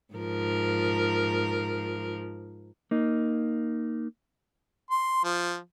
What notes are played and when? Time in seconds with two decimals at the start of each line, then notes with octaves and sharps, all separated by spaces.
0.14 G#2 F3 A#4
2.91 A#3 D#4
4.91 C6
5.24 F3